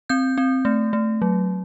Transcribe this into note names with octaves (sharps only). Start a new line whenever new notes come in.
C4 G6
C4
A3
A3
F#3